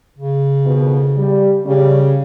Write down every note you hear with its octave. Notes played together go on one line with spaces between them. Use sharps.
C#3
F2 B2 D#3
G3
C#3 G3 C#4